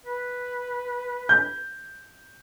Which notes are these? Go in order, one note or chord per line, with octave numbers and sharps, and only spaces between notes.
B4
G6